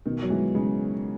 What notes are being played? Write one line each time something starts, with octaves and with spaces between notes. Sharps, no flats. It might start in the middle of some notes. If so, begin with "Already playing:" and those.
B2 D#3
F#3
E3 G#3
C#3 G#3